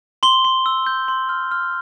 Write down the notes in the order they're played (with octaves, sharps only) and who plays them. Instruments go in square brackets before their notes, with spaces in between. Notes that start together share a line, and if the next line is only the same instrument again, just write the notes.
[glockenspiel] C6 G7
C6
E6
G6
C6
F6
F6